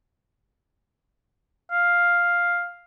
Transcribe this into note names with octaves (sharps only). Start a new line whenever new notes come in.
F5